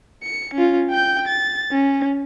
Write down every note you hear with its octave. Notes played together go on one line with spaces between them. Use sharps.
C#7
C#4 F4
G5 G6
A6
C#4